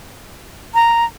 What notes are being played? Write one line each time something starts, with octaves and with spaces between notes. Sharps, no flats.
A#5